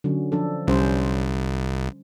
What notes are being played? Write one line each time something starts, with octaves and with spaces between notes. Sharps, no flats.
D3 F#3 C#4
F3 D4 A4
C2 G3 C#4 C5